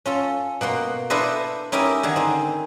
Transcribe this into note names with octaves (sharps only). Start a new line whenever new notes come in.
C#4 F4 A4
B2 A#3 F#5 C6
D4 E4 A4 B4 C5 D#5
C#4 D#4 E4 G4 A#4 D#5
D3 D#3 G#4
C4 D#4